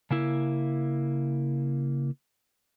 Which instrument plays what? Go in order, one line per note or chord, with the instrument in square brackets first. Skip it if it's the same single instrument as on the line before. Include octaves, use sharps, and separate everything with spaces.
[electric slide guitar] C#3 A#3 E4